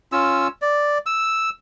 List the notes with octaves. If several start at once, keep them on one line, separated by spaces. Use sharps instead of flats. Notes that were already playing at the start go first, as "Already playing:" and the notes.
C#4 F4 E6
D5
E6